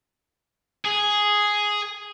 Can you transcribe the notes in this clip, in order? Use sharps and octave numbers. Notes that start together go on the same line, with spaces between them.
G#4